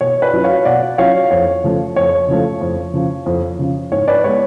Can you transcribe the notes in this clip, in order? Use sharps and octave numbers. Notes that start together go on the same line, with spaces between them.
B2 C#5
B4 D5
F#3 C#4 F4
C#5 F5
B2 D5 F#5
F#3 C#4 F4 C#5 F5
F2 C#5
C#3 F3 A3
F2 C#5
C#3 F3 A3
F2
C#3 F3
F2
C#3 F3
G#2 C#5
B4 D5
G#3 B3 C#5